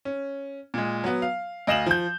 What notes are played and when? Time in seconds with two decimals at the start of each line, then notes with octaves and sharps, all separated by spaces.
0.05 C#4
0.74 A#2 G#3
1.04 F#3 B3
1.22 F5
1.67 D2 D#5 F5 E7 F#7
1.86 F3 G6